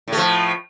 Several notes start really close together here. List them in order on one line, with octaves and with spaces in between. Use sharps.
A2 A3 F3